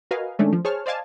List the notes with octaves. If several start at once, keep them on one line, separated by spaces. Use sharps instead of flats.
F#4 A#4 B4 D#5 F5 G#5
D#3 G#3 A3 C#4 D4
F3
G#4 C5 C#5 A5 F6
C5 D5 D#5 F5 G#5 A5